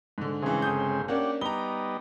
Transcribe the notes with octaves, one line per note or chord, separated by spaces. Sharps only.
G#2 D3
G2 C#3 E3 G#3 C4
G1 D#6 G6
A#3 C#4 D4 G4 F#5
G3 B3 D#4 A#5 G7